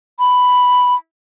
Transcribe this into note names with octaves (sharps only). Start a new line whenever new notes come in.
B5